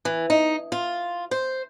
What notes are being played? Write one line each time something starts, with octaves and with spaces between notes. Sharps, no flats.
E3
D#4
F4
C5